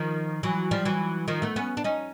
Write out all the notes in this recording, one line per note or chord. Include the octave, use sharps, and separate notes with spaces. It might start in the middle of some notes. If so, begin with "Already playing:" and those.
Already playing: D#3 F3
E3 F#3
F3 G3
E3 F#3
D#3 F3
A3 B3
B3 C#4
D4
C#4 D#4